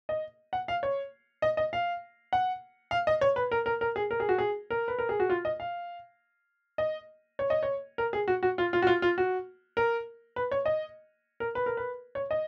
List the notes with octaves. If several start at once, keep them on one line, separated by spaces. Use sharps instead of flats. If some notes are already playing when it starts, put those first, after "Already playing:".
D#5
F#5
F5
C#5
D#5
D#5
F5
F#5
F5
D#5
C#5
B4
A#4
A#4
A#4
G#4
A#4
G#4
F#4
G#4
A#4
B4
A#4
G#4
F#4
F4
D#5
F5
D#5
C#5
D#5
C#5
A#4
G#4
F#4
F#4
F4
F4
F#4
F4
F4
F#4
A#4
B4
C#5
D#5
A#4
B4
A#4
B4
C#5
D#5